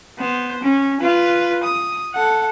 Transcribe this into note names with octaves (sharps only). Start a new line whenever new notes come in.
B3 C5
C#4
F4 B4
D#6
A4 F#5